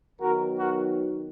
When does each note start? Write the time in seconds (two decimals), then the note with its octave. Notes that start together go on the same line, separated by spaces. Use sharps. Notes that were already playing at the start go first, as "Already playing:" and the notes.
0.21 D#3 F#3 B3 D#4 F#4 A#4
0.57 F#4 A#4